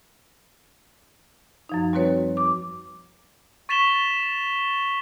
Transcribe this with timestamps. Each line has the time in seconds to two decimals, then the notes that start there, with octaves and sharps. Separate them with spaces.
1.69 F#2 F3 D#4
1.93 G3 C4 F#4 B4 C#5
2.37 D6
3.69 C#6 A6 B6 E7 F7 G7